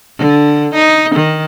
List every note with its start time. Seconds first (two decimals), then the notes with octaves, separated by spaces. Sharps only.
0.18 D3
0.75 D#4
1.15 D#3